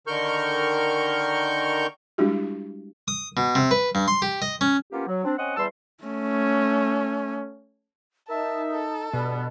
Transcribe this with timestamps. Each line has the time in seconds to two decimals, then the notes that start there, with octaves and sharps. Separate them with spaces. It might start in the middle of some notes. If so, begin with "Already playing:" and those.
0.07 D3 D#3 A#4 C#6 F6 G6
2.18 G3 G#3 D4 E4 F#4 G4
3.08 D#6
3.37 B2
3.55 C3
3.71 B4
3.95 G2
4.08 C6
4.22 G4
4.42 D#5
4.61 C#4
4.91 A#3 B3 C#4 F4 G4
5.07 F#3
5.24 C4 D4
5.38 C4 C#4 D#5 F#5
5.57 E2 E3 G3 A5 C6 E6
6.04 A3 C#4
8.29 D#4 A#4 E5 A5 E6
8.72 A4
9.13 G2 B2 B3 D5